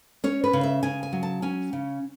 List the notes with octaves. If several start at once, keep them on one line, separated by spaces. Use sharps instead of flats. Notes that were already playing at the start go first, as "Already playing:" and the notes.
C#4 C#5
B4
C#3
E5
C#3 G#5
G#5
F#3
A5
C#4 G#5
C#3